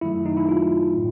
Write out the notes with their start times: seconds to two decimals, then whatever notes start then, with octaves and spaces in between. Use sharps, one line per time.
0.01 F#2 D#3 F#3 A3 E4
0.26 D#4
0.37 E4
0.49 F4
0.95 A2